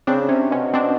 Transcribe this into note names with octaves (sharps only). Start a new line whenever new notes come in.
C#3 C4 D4
C3 C#4
B2 C#4
C4 D4